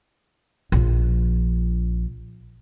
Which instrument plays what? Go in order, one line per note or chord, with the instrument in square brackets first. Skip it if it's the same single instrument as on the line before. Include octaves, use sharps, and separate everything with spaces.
[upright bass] A#1 F3